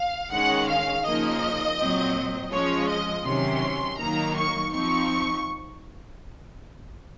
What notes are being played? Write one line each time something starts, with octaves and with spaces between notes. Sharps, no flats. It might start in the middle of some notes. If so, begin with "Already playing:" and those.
Already playing: F5
D#3 G#3 C#4 F#5
F5
C#3 F3 A#3 D#4 D#5
A#2 F#3 C4
F3 G#3 C#4 C#5
D#5
C3 D#3 F#3 C#4 C6
D#3 F#3 A#3 D#4 A#5
C#6
F3 C4 D#4 C#6